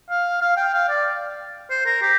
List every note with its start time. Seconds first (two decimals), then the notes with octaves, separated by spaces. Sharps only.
0.09 F5
0.41 F5
0.57 G5
0.74 F5
0.89 D5
1.70 C5
1.86 A#4
2.02 G4